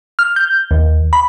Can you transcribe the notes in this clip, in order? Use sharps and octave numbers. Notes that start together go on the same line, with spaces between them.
F6
G6
D#2
B5